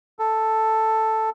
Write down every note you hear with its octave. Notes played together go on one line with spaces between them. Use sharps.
A4